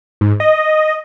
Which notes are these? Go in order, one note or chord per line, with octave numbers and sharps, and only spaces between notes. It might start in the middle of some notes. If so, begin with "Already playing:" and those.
G#2
D#5